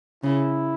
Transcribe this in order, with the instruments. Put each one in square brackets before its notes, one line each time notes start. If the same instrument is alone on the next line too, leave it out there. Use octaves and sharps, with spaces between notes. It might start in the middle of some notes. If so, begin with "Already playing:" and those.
[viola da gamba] C#3 [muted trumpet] E4